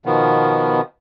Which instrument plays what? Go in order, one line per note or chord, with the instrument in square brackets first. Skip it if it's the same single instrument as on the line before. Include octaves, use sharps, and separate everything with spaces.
[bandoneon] B2 D#3 F3 B3